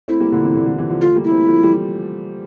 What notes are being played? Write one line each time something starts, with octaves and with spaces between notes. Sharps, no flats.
A3 C4 E4
G3 A#3
A#2 D3
C3 E3
A#2 D3
A#2 D3
C3 E3
D3 F3
F3 A3 F4
G3 A#3
E4
A3 C4
F3 A3
E3 G3